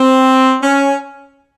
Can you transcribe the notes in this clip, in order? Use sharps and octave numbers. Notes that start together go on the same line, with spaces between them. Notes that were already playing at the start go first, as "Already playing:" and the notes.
Already playing: C4
C#4